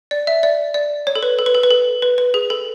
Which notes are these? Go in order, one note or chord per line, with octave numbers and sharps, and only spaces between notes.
D5
E5
D5
D5
C#5
A4
B4
A4
B4
A4
B4
A4
B4
B4
G#4
A4